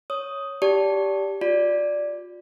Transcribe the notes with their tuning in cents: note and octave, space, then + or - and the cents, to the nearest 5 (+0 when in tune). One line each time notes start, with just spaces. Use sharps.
C#5 +0 D#6 +5
G4 +0 D5 -25 A5 +0
F4 +40 D5 +0